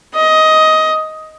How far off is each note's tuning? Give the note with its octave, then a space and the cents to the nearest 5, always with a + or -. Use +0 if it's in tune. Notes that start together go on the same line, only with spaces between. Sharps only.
D#5 +15